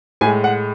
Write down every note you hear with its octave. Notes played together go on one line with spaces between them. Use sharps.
A2 G#3 G#5
F#5